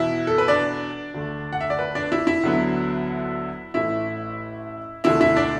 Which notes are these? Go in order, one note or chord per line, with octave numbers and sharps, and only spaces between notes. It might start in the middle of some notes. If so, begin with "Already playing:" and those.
Already playing: E2 B2 B3 E4 E5
A4
B4
D4 D5
D2 D3 A3
F#5
E5
D5
B4
D4 D5
E4 E5
E4 E5
D2 D3 F#3 B3
A1 A2 A3 E4 E5
E1 D2 D3 A3 E4 E5
E4 E5
D4 D5